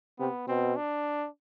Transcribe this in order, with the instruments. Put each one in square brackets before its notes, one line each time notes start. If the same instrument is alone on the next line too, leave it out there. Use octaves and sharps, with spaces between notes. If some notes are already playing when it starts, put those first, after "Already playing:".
[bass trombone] C3 [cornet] B3
[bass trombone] B2 [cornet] C4
[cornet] D4